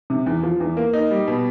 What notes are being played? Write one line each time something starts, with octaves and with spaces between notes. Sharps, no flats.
C3
E2
F3
E2
A#3
D#4
G3
B2